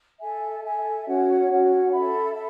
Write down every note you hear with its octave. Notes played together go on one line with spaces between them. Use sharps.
A4 E5 G#5
A4 E5 G#5
C#4 F#4 C#5 F#5
C#4 F#4 C#5 F#5
A4 E5 B5
A4 E5